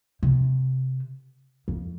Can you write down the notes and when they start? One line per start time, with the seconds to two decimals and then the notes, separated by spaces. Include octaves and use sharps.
0.23 C3
1.68 F2